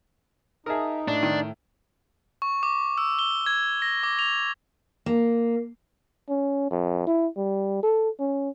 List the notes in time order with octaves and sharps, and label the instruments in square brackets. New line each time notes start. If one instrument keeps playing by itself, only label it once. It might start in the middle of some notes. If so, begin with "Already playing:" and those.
[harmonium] D#4 [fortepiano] G#4 A#4 [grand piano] E5 A5 D#6
[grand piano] A2 [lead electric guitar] D4
[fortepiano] D#3
[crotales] C#6
D6
E6
G7
G#6
A#6
D6
F7
[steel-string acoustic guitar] A#3
[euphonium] C#4
F2
E4
G3
A4
C#4